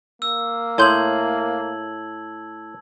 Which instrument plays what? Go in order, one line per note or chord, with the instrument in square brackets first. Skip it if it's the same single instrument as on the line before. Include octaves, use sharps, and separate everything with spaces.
[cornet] A#3 [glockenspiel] E6
[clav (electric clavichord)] A2 [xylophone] C#5 C6 G6 [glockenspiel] A5 G#6 F#7